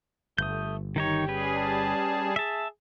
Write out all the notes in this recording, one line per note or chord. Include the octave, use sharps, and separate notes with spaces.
G1 A3 D#6 G6
D#3 D#4 G4 C#5
G3 C#4 G#4 B4
A5
G#4 E5 A5